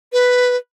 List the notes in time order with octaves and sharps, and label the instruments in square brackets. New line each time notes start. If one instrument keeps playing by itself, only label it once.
[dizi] B4